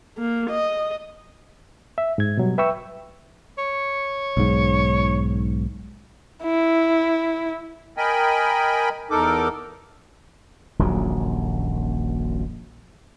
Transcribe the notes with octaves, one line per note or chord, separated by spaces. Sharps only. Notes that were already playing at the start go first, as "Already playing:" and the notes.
A#3
D#5
E5
G#2 G#6
B2 F#3 G3
B4 E5 G5 C#6 E6
C#5
B1 G#2
E4
A#4 D#5 G5 G#5 B5
E2 D#4 A4 A#4 D6
D#1 A#1 F#2 F#3